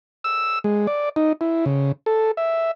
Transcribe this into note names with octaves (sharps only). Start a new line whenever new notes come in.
E6
G#3
D5
D#4
E4
C#3
A4
E5